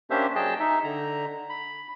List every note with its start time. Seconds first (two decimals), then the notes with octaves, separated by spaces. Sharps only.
0.10 A#3 C#4 D4 G4 C5 E5
0.35 F#3 G#4 D#5 G5 A5
0.60 D#4 E5
0.84 D3 A#5
1.50 B5